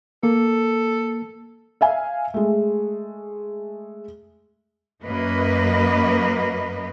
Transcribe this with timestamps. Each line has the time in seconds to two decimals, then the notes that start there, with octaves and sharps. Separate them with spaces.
0.23 A#3 A4
1.81 E5 F5 G#5
2.34 G#3 A3
5.04 F#2 A#3 B4 D#5